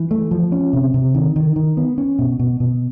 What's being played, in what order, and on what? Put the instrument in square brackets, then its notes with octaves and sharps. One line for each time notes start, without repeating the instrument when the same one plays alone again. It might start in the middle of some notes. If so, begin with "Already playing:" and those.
Already playing: [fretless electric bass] E3
A3
F3
C#4
C3
C3
D#3
D#3
D#3
B3
C#4
B2
B2
B2